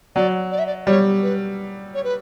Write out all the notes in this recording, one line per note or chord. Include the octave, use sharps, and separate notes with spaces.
F#3 D5
D5
E5
D5
G3 C#5
B4
C#5
B4